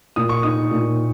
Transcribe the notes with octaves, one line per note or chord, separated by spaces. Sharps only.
A#2 D#6
C#6
D#4 D#6
A#2